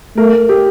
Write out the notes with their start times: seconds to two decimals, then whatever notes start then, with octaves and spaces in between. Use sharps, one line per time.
0.17 A3 A#4
0.49 G4